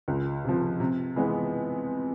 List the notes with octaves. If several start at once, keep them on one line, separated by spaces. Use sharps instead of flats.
C#2
C3 F3
C3
E3 G#3 B3